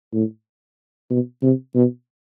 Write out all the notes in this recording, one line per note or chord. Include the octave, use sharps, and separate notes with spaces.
A2
B2
C3
B2